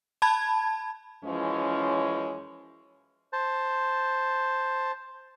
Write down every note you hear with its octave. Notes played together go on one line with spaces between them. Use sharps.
A5 B5 G#6
F#2 E3 F3 G#3 C#4
C5 A5